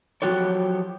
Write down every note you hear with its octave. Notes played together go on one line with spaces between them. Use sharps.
F3 F#3 F#4 G4 A4 C#5